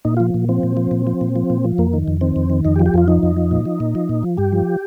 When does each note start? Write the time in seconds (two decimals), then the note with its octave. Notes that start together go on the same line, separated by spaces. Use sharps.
0.05 A#2 D#4
0.17 F3 F4
0.34 A#2
0.49 F3 C4
0.63 A#2
0.77 F3
0.91 A#2
1.07 F3
1.21 A#2
1.36 F3
1.50 A#2
1.64 F3
1.78 F2 A#3
1.93 D#3
2.08 F2
2.21 D#3 C4
2.36 F2
2.50 D#3
2.65 F2 D#4
2.76 G4
2.79 F3
2.86 G4
2.94 F2 F4
3.08 F3 D#4
3.23 F2
3.36 F3
3.51 A#2
3.65 F3
3.80 A#2
3.95 F3
4.09 A#2
4.23 F3
4.37 G2 G4
4.53 F3